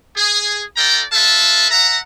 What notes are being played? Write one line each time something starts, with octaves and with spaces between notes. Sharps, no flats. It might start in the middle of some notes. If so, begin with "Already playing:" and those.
G#4
F4 A4 D5 G5 A#5
F4 A4 B4 E5 A5
E5 F#5 A#5